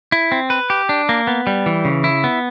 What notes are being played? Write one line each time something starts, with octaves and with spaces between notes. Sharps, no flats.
E4
C4
B4
G4
D4
A#3
B3
G3
E3
C#3
E4
B3